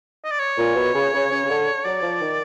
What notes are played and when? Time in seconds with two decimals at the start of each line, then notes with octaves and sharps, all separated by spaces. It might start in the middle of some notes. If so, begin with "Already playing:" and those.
0.24 D#5
0.31 D5
0.39 C#5
0.57 A#2
0.75 B2
0.93 C#3
1.12 C#3
1.29 C#3
1.44 C#3
1.48 D3
1.84 F#3 D5
2.02 F3
2.20 D#3